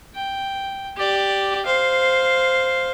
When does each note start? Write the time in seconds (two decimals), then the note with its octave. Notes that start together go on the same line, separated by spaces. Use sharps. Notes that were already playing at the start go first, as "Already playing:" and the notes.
0.15 G5
0.97 G4 D5
1.66 C5 F5